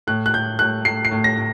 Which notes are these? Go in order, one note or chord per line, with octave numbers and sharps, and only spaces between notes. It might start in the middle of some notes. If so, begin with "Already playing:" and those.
A2 F#6
F#6
A2 G6
A2 F#6
A2 C7
C7
A2
A#6
A2